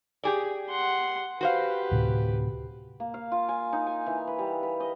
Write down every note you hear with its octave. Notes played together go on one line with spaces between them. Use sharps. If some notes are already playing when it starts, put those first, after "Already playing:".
G4 G#4 D5
F#5 C6
F#4 G4 B4 C5 F5
D2 A2 C3
A#3
F5
F4
G#5
D#4
G#5
E3
B4
G3
B4
D#5